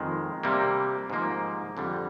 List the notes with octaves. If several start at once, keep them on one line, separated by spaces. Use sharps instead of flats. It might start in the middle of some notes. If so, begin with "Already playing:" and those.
Already playing: F2 D#3 G#3
C3 G3 A#3
G#2 F3 A#3
F2 D3 G3